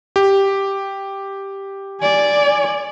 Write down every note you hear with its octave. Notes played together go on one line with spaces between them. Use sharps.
G4
D5 G#5